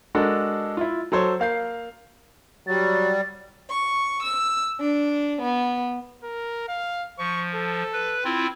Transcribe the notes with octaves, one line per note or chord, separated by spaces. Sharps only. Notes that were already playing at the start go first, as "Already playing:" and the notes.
G#3 D4 F#4 A4 A#4
E4 F4
F#3 A4 C5 C#5
A#3 F5 G6 C7
F#3 G3 A6
C#6
E6
D4
B3
A#4
F5
F3 C#6
A4
B4
C4 E4 F4